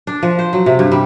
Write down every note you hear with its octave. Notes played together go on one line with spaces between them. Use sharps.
D4
F3
C5
F#3
C3
G2
G3